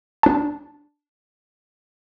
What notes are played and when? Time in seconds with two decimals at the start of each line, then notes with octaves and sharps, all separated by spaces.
0.23 D4 A5